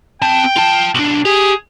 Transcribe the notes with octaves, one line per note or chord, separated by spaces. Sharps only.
C4 G5 A5
F4 A5
B1 D4
G4 G#4